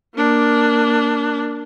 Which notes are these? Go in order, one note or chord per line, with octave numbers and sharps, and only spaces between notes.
A#3 D4